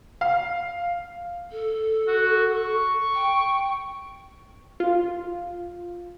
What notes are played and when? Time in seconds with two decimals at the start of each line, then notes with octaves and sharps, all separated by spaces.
0.21 F5
1.52 A4
2.07 F#4
2.56 C#6
3.15 G5
4.80 F4